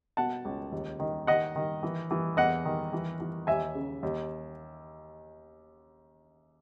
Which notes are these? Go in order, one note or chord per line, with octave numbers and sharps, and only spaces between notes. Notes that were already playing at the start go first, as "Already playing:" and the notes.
B2 F#5 A5
C#2
D#2
D#3
D#3 D#5 F#5
D#3
E3
E3
E2 D#5 F#5
D#3
E3
E3
D#2 E5 G#5
C#3
D#2